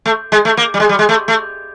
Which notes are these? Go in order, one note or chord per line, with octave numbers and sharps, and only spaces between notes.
A3
G#3
A3
A#3
G3
G#3
G3
G#3
A3
A3